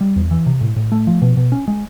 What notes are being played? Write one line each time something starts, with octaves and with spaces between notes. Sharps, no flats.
G3
E2
E3
C3
A2
A2
A3
F3
B2
B2
C#4
G#3